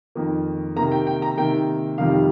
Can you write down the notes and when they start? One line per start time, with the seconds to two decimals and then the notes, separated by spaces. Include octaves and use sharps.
0.15 F2 D#3 A#3
0.76 C3 D#3 A#3 A#5
0.92 G5
1.07 G5
1.22 A#5
1.37 C3 D#3 A#3 G5
1.98 F2 C3 D#3 G3 F5